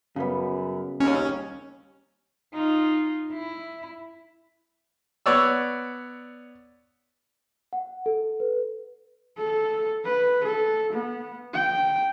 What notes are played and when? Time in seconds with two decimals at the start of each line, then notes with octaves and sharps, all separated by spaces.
0.16 F#2 C#3 G3 B3
1.00 D#2 C#4
2.54 D#4 F4
3.33 E4
5.26 B3 C#5 D5 E6
7.73 F#5
8.06 A4
8.40 B4
9.38 A4
10.05 B4
10.44 A4
10.92 B3
11.54 G5